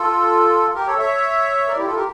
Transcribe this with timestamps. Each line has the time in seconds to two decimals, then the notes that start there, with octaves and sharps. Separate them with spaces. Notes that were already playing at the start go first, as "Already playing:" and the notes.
Already playing: F4 A4
0.75 G4 A#4
0.86 A4 C#5
0.98 C#5 E5
1.68 A#4 D5
1.77 E4 G4
1.86 F4 A4
1.95 G4 A#4